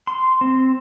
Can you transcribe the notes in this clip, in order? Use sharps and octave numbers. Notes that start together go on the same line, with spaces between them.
C6
C4